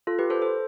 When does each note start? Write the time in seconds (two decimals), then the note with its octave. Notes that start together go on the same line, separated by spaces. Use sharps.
0.07 F4 A4
0.19 G4 B4
0.30 A4 C5
0.42 A4 C5